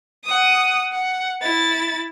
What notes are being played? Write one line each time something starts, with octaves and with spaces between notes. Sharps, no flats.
F#5 D#6
F#5
E4 A6